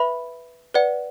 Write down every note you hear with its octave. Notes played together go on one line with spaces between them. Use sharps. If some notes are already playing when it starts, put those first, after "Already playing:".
Already playing: B4 E5 B5
B4 D5 F#5